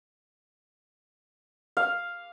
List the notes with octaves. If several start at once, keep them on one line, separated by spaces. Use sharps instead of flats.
F5